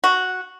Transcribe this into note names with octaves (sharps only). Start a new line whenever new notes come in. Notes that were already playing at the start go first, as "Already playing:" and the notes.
F#4